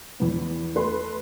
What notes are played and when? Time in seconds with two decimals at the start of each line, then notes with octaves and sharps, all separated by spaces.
0.20 E2 B3
0.75 A3 B4 C6